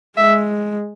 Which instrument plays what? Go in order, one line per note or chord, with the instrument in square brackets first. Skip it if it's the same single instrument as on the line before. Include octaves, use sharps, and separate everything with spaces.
[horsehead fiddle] G#3 [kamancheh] E5